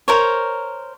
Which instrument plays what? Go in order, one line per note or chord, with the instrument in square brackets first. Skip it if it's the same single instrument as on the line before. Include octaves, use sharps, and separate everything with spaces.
[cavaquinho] A#4 C5 C#5